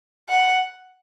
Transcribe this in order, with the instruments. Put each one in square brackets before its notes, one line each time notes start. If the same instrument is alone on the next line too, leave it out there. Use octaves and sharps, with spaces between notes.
[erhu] F#5